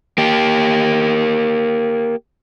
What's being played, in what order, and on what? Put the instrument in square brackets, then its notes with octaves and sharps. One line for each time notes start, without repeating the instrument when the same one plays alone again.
[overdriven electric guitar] A#3 G4